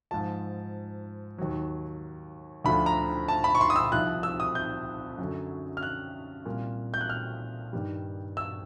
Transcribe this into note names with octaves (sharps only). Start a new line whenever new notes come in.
G#2 F3 A5
D#2 D#3 F#3
D2 D3 F3 B5
A#5
A5
B5
C#6
C6
D#6
E6
C2 C3 F3 F#6
E6
D#6
G6
F#2 D3 F#3
F6
F#6
C2 A#2 G3
G6
F#6
F6
G2 D#3 G3
E6